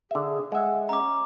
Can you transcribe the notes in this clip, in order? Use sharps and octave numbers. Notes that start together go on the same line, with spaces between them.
D3 G#4 E5
G#3 E5 F#5
C#4 A#5 D6